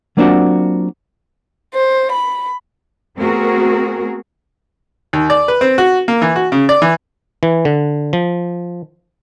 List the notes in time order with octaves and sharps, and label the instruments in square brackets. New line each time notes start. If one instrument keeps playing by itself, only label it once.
[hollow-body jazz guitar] F#3 A#3 C4 D4 F4 F#4
[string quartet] C5
B5
[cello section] A3 B3 C4 F#4 G#4 A#4
[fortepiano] D#2
D5
B4
C4
F#4
A#3
E3
F#4
C#3
D5
E3
[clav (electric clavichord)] E3
D3
F3